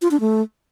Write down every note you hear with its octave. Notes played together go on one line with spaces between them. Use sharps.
F4
D4
A3